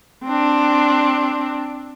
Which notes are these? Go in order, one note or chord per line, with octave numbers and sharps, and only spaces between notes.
C4 D4